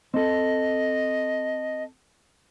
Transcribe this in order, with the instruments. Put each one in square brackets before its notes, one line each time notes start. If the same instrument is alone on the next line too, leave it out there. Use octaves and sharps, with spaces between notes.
[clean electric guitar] C4 A4 [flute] D#5